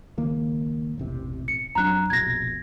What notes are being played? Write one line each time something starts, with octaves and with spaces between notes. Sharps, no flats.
C#2 D#3 A#3
E1 A1 C3
C#7
F2 F#3 D4 A#5 F#6
F1 A#1 B2 G#6 A#6